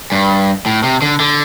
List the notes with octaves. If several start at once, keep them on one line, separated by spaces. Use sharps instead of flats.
G2
A2
C3
D3
D3